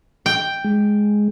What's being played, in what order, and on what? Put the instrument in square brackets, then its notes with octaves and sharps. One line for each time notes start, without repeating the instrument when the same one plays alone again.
[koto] G5
[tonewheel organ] G#3